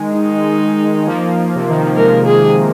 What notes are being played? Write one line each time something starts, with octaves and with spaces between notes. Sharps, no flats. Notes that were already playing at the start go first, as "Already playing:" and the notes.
Already playing: D#3 G#3
D#4
F3 A#3
C3
D#3
F3
D#3 G#3 A#4
G#4